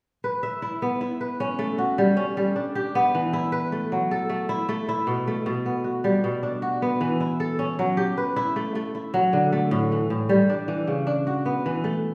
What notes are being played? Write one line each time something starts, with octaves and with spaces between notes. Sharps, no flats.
B4
E5
E4
B3
E4
B4
C#4
A3
F#4
G3
C#4
G3
D4
G4
B3
E3
E4
B4
A3
F#3
A4
A3
E4
A3
E4
B2
A3
B2
B3
F#4
G3
B2
D4
F#4
B3
E3
E4
A4
C#4
F#3
G4
B4
E4
A3
A3
E4
F#3
D3
A3
A2
E3
A2
G3
D4
E3
C#3
D4
F#4
B3
E3
A3